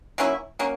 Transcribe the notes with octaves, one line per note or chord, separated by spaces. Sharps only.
F#3 A#3 C#4 E4
F#3 A#3 C#4